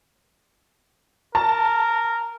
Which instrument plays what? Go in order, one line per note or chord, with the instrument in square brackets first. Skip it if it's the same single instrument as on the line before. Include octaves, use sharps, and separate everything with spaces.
[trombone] A#4 [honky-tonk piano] A5